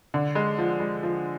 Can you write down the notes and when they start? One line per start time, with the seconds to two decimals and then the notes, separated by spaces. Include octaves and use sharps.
0.14 D3
0.35 G#3
0.58 F3
0.80 G#3
1.03 F3